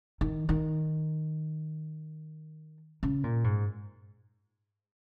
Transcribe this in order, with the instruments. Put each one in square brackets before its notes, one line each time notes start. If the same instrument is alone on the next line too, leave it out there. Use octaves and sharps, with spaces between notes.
[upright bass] D#3
D#3
C#3
A#2
G#2